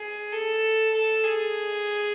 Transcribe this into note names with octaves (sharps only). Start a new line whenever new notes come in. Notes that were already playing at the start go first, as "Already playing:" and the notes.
Already playing: G#4
A4
A4
G#4